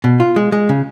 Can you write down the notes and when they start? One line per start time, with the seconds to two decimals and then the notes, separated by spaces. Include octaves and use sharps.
0.04 B2
0.20 F4
0.36 G#3
0.52 G#3
0.69 C#3